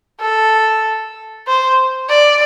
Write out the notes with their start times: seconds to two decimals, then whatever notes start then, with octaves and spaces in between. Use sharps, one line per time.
0.20 A4
1.47 C5
2.10 D5